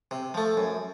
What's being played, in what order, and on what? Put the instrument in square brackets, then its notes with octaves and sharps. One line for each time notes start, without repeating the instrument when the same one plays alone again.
[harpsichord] C3
F3 A3
F#2